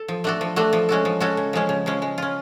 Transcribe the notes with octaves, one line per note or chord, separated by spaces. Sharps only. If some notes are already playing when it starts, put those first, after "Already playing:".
Already playing: A4
F3
A3 D4 F#4 A4
F3
A3 D4 F#4 A4
F3
G#3 C#4 F#4 A4
F3
G#3 C#4 F#4 A4
C#3
F3 G#3 C#4
C#3
F3 G#3 C#4
G#3
C#4 F4